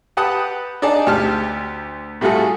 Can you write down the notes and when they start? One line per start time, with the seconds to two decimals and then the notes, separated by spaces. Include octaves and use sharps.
0.17 G4 B4 F#5 G5 A5 D#6
0.82 D4 D#4 G#4 D5 A5
1.07 D2 G4 A5 F6
2.21 A2 G3 A3 F4 F#4 G#4